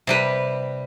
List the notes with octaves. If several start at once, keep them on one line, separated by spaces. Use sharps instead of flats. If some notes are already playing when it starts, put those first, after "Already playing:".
C3 G3 B4